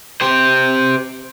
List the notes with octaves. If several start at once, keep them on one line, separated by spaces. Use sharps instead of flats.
G4 C5